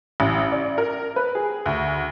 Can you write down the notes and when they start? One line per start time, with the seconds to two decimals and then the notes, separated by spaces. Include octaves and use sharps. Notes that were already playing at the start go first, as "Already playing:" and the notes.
0.20 A1
0.52 D5
0.78 A#4
1.16 B4
1.35 G#4
1.66 D2